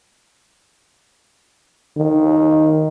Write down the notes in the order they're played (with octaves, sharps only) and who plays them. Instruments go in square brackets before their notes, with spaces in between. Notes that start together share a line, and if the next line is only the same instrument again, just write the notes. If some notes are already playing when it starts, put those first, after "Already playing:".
[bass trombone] D#3